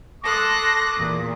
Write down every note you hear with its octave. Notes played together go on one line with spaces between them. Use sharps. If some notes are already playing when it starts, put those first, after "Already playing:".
A4 C6 D6 D#6 F#6 A#6
E2 A#2